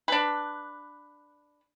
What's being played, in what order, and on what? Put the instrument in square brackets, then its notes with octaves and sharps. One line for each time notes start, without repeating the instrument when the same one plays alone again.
[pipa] D4 B4